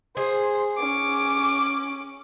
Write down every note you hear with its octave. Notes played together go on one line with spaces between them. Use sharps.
G#4 C5
C#4 D6